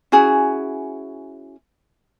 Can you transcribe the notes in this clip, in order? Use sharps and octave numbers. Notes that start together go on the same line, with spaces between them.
C#4 E4 F#4 G#4